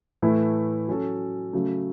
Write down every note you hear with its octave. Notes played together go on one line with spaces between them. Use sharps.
A2 E3 A3 E4
F#3 C#4 F#4 A4
C#3 F#3 A3